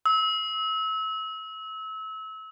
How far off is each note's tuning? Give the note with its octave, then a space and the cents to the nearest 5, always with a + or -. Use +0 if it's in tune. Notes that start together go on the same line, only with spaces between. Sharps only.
E6 -30